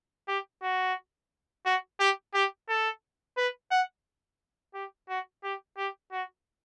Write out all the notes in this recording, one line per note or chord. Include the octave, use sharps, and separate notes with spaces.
G4
F#4
F#4
G4
G4
A4
B4
F#5
G4
F#4
G4
G4
F#4